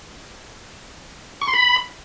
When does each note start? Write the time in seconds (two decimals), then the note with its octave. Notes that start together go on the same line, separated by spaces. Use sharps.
1.41 C#6
1.47 C6
1.53 B5